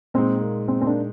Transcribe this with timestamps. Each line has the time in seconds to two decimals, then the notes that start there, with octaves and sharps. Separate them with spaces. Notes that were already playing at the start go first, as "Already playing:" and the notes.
0.14 A#2 G#3 C4 D#4
0.41 A#3
0.68 C4
0.81 C4
0.86 A#3 D4